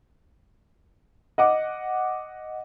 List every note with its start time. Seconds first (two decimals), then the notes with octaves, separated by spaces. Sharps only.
1.38 D#5 F#5 D6